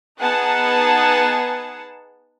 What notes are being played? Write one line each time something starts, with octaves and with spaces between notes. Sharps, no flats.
B3 D#4 G#4 F#5 A5